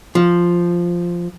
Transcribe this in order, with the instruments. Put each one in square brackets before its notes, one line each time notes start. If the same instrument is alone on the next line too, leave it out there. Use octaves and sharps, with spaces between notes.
[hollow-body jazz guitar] F3